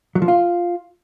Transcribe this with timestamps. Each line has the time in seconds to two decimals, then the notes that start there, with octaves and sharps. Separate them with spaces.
0.15 F#3
0.22 F3
0.28 F4